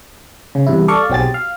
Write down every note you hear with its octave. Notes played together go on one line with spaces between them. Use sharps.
C#3
E2 G2 C3 E4
A4 D5 F5 C#6
B1 F#3 C4 G4 G#4 A6
F5